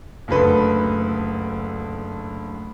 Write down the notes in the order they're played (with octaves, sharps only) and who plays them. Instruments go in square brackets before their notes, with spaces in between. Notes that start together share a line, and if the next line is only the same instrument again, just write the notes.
[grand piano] F#1 D2 A4 B4